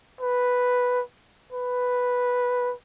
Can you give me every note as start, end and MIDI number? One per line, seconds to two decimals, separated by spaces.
0.21 1.01 71
1.53 2.73 71